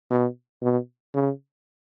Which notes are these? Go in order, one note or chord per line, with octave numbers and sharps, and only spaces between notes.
B2
B2
C#3